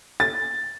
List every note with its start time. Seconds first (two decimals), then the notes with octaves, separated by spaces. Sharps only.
0.20 A6